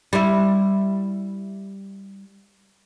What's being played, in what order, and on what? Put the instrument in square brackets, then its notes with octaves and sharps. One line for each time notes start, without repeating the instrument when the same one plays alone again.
[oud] G3 E4